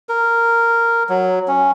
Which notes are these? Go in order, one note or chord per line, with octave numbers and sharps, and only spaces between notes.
A#4
F#3
C#4